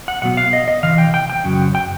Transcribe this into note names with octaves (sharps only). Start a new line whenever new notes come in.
F#5
B2 F#3 B3 F#5
F5
D#5
D#5
C3 E3 F5
G5
G5
G5
F#2 C#3 F#3
G5